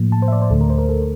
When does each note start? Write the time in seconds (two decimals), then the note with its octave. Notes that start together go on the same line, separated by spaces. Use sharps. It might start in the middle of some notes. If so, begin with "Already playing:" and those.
Already playing: A2 F3 A#3
0.12 A5
0.22 C5
0.28 E5
0.32 D5
0.42 C5
0.51 D2 D3 A3 A4
0.61 A#4
0.70 C5
0.78 A#4
0.89 A4